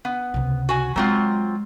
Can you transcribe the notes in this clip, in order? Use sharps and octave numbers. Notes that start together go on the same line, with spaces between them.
B3
C#2 C3
F#4 G#5
F#3 G#3 C4 F4